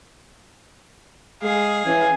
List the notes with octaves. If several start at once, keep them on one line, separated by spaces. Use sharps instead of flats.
G#3 G#4 F5
E3 C#4 G#5